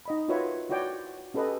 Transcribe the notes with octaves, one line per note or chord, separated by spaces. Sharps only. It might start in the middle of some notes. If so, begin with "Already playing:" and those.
D#4 D#5 B5
F4 F#4 A#4 B4 C#5 E5
E4 F#4 C#5 D5 G5
C#4 G4 A4 B4 D#5